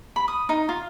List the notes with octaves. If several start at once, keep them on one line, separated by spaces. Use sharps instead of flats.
B5
D#6
D#4
F4